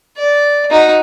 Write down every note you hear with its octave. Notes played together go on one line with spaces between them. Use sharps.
D5
D#4 F#4